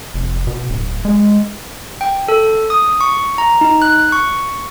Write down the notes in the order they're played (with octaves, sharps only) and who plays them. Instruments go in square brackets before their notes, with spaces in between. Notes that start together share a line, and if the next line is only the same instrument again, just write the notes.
[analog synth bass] F1
B2
D1
G#3
[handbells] G5
A4
D#6
C#6
A#5
D#4
F#6
C#6